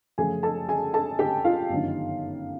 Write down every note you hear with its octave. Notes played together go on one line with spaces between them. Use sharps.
F#2 C#3 F3 A3 G#4 G#5
A4 A5
G#4 G#5
A4 A5
G4 G5
F4 F5
G1 F#2 D#3